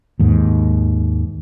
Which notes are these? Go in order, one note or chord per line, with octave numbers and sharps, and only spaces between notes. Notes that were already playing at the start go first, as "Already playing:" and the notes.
D#2 G#2